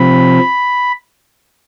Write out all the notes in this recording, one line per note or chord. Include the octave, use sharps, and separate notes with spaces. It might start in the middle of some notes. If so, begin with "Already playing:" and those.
Already playing: C3 F3 C4 B5